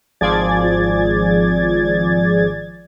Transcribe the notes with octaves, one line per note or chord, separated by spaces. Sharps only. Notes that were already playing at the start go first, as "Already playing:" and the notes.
G#1 F3 G#4 D5 G#6 A6